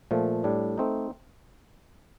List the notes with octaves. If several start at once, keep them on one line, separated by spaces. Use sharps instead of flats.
A#2 F3 A3
A2 G3 D4
A3 C4 D#4